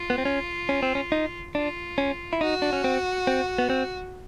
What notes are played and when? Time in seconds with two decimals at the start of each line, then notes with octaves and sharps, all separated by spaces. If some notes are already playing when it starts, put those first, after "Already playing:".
Already playing: F4
0.10 B3
0.18 C4
0.25 C#4
0.69 C#4
0.83 C4
0.95 C#4
1.12 D#4
1.55 D4 F4
1.98 C#4
2.33 E4
2.41 D#4 F#4
2.62 D4
2.73 C#4
2.84 C4
3.27 C4
3.58 B3
3.70 C4